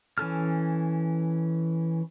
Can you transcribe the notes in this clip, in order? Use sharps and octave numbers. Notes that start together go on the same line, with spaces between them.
E3 C#4 A4 F6